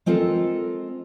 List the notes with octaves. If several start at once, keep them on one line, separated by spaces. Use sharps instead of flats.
G#3 C4 F4 A4 A#4